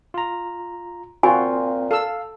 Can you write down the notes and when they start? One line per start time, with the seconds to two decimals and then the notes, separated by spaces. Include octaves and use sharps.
0.14 F4 A#5
1.23 A#2 C4 F4 F#4 G#5
1.91 A4 F5 E6